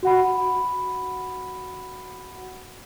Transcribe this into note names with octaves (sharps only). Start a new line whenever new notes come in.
F#4 F#5 B5